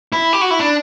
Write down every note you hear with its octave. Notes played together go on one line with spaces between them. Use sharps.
E4
G4
F#4
E4
D4